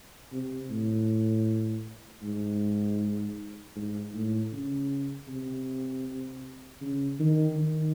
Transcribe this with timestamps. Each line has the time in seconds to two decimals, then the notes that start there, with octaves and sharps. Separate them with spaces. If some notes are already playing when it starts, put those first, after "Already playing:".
0.33 C3
0.70 A2
2.23 G#2
3.76 G#2
4.14 A2
4.52 C#3
5.28 C3
6.81 C#3
7.20 D#3
7.57 D#3